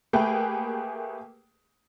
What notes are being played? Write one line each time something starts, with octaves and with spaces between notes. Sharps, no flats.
A3 A#3 G4 G#4 B4 G5